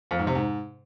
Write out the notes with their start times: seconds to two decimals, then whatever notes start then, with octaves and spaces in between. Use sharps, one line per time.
0.11 F2
0.19 G#2
0.27 C3
0.35 G#2